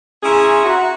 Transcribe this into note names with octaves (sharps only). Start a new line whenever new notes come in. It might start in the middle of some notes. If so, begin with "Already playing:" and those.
C#4 E4 G#4 E5 A#5 C6
F#4